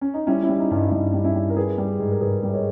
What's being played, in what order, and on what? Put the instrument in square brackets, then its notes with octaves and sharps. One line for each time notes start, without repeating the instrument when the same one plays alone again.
[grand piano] C#4
D#4
G3 C#4 E4
C#4 E4
G3
D#4
G2
D#4
E4
G2 D#4
G3
C#4 E4
G3
A#4
G3 G#4 B4
G3
G#2
A#4
G#2 G#4 B4
G3
D#5
A#4 C#5